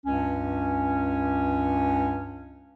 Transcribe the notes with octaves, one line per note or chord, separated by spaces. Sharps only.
C#2 G2 C#4